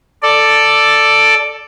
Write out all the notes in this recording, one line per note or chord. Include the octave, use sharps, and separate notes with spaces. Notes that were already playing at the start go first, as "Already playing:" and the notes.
A4 D5